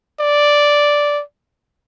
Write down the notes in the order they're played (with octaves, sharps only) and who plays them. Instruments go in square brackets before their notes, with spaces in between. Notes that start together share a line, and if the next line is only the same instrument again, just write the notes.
[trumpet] D5